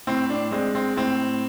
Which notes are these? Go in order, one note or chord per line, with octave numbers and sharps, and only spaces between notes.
A2 C4
D4
G#3 C4
C4
A2 C4